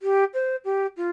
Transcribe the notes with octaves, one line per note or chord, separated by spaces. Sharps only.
G4
C5
G4
F4